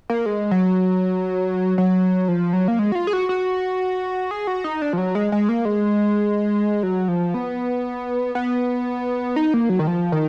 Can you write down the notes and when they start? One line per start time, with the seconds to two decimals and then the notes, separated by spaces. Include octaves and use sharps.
0.10 A#3
0.26 G#3
0.51 F#3
1.78 F#3
2.28 F3
2.53 F#3
2.68 A#3
2.79 G#3
2.92 F#4
2.95 F4
3.07 G#4
3.13 F#4
3.29 F#4
4.31 G#4
4.47 F#4
4.64 D#4
4.82 D4
4.93 F3
4.98 F#3
5.15 G#3
5.32 G#3
5.49 A#3
5.65 G#3
6.83 F#3
7.08 F3
7.34 B3
8.35 B3
9.36 D#4
9.54 A#3
9.69 F#3
9.79 D#3
9.87 F3
10.12 D#3